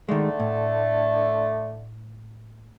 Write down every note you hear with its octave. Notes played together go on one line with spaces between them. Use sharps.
D3 D#3 G#3 A3
A2